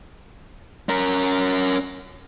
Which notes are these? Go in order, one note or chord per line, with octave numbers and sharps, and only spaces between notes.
C#4 A#4